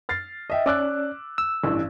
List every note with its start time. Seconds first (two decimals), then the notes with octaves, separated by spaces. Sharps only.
0.09 F6 A6 C7
0.50 D#5 E5 G5
0.66 C#4 D5 D6 E6 F#6
1.38 E6
1.64 A1 G2 E3